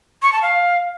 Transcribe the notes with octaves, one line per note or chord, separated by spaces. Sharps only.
C#6
A5
F5